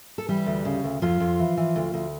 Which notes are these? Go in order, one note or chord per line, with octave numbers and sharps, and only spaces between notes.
A4
E3 G3 G4
D2
C#3
D2
F2 F3 F4
F2
E3
E3
D2
D2